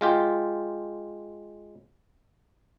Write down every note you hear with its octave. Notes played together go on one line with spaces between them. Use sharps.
G#3 F4 G4